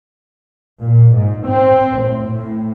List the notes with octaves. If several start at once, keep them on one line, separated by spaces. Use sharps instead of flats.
A#2
G#2
C4
A2
A2